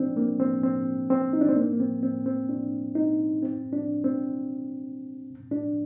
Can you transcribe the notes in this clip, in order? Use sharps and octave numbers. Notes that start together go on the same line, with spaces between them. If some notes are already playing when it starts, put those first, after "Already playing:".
Already playing: C4 D4
A#3
C4
C4
C4
D#4
D4
C4
A#3
A#3
C4
C4
C4
D4
D#4
C4
D4
C4
D4